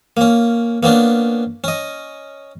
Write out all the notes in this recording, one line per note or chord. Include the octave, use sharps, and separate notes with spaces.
A#3 C#4
A#3 B3 C#4 D4
C#4 D#5